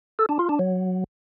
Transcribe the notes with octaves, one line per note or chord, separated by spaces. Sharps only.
A4
D4
F4
D4
F#3